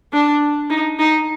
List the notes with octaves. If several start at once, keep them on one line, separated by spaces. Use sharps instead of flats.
D4
D#4
D#4